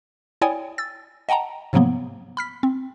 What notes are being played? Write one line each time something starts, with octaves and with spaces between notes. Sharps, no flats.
E4 C#5 D5 G5 G#5 D#6
E6 A6
D#5 F#5 G5 A5 A#5
G#2 C3 F3 F#3 A#3 B3
B5 F6 B6
C4